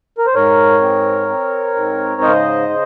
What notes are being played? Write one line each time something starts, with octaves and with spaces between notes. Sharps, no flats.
A#4
C5
G#2 A#4 C#5
C4
C4
G#2
C#3 C5 D#5
C#3